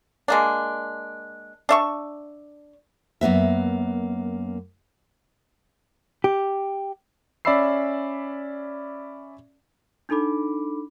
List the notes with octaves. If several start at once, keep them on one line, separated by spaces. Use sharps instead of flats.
G#3 A#3 D4
D4 E5 C#6
F#2 A#3 B3 E5
G4
C#4 D5 E5 B5 E6 C7
D4 D#4 A4 B5 D6